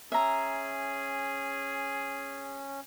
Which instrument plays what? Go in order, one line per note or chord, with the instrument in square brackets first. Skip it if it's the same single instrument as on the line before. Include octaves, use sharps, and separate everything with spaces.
[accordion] C#4 [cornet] G#4 [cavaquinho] E5 A#5